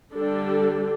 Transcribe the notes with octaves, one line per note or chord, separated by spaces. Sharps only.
D3 G3 D4 A4